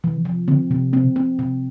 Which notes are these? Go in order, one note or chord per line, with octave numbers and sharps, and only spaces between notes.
C3 E3
F3
D3 C4
C3 C4
C4
C4
C3